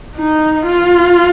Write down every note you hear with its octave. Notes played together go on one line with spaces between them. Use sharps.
D#4
F4